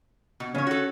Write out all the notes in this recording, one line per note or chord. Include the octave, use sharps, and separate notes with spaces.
B2
C#3 C#4 C#5
F#4 A4